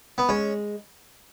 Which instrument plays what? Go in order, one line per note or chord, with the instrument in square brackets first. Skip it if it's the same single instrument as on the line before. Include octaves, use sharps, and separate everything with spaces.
[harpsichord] B3
[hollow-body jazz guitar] G#3 [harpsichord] C#4